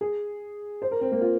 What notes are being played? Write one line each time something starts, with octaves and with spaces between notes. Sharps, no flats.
G#4
C5
A#4
C4
A#3
F4